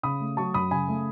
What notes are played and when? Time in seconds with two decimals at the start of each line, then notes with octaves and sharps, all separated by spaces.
0.03 C#3 B5 D#6
0.20 A3
0.37 F#3 A5 C#6
0.54 F#2 B5 D#6
0.71 C#3 G#5 B5
0.88 A3